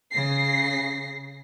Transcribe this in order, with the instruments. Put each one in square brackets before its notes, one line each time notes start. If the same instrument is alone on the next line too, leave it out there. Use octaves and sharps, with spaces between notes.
[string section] C#3 A#6 C7